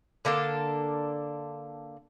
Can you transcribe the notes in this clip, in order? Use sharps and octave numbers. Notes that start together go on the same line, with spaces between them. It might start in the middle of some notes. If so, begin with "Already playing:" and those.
D3 A#3 D4 A4